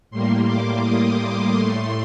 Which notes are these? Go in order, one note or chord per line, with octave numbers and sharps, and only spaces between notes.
A2 G3 A#3 C6
D6
D#6
D6
A2 A3 C6